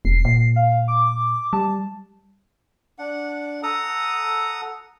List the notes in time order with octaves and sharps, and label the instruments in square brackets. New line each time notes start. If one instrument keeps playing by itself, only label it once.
[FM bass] E1 [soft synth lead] C7
[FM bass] A#2
[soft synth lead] F5
D6
[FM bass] G3 [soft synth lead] A5
[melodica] D4 F#5
A4 F#5 A#5 D#6